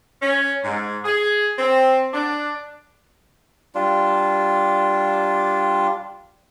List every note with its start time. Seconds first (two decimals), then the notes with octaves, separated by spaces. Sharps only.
0.22 C#4
0.64 G#2
1.05 G#4
1.59 C4
2.14 D4
3.75 G3 D4 F4